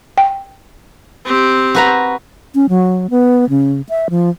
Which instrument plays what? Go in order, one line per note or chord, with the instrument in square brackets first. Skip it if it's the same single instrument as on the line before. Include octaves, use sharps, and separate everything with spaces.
[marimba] G5
[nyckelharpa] C4 G4
[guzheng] F#4 B4 A#5
[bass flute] C#4
F#3
B3
C#3
E5
F3